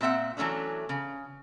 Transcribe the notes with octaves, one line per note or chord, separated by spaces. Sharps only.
A#2 C4 E5 F#5
E3 F#3 A3 C#4 D4
C#3